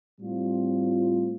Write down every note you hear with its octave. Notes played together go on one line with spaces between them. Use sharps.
A2 G3 C4 F4